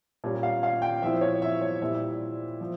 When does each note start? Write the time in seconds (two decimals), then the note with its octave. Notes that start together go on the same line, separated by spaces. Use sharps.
0.24 A#2 G3 C#4
0.43 F5
0.63 F5
0.82 G5
1.02 A#2 F3 C4 E4 E5
1.21 C#5
1.42 E5
1.61 C#5
1.81 A#2 G3 C4 E4 E5
2.61 F3